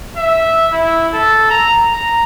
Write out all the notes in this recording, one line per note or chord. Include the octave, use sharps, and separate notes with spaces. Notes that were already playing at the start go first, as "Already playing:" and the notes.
E5
E4
A4
A#5
A#5